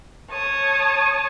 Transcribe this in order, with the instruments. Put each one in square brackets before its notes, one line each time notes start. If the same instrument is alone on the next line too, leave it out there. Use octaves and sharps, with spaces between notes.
[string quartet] C#5 A5 D#6